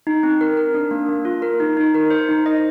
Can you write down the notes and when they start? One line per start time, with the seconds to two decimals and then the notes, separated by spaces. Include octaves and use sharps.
0.07 D#4
0.23 C4
0.41 A#4
0.57 A#4
0.74 D4
0.91 A#3
1.09 A#3
1.25 F4
1.42 A#4
1.60 D#4
1.77 D#4
1.95 A#4
2.10 C5
2.29 D#4
2.46 D#5